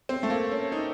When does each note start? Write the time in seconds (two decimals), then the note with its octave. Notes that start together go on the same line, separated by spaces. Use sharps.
0.09 C4
0.23 A3
0.30 A#3
0.51 C#4
0.72 D#4